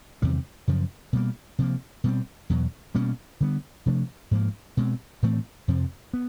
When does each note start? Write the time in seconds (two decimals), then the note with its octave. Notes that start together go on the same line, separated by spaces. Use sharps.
0.22 E2 C3 D#3 G3
0.68 F#2 C#3 F3
1.13 B2 G3 A#3
1.59 C3 F3 A#3
2.04 B2 G3 C4
2.50 E2 B2 F#3
2.95 B2 G3 A#3 C#4
3.41 D3 G3 B3
3.86 C3 F3 A3 D4
4.31 G#2 F3 A#3
4.77 B2 G#3 C4
5.23 A2 E3 A3 C4
5.68 F2 C3 F3
6.14 B3